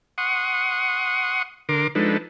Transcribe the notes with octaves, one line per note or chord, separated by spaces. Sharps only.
F#5 C6 C#6 D#6
D3 A#4 C6 D6
F3 G#3 D4 D#4 A4 B4